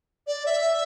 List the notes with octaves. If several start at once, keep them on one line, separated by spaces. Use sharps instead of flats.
D5
E5